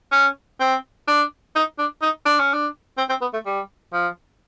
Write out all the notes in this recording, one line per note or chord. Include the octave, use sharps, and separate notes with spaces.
C#4
C4
D4
D#4
D4
D#4
D4
C#4
D4
C4
C4
B3
A3
G3
F3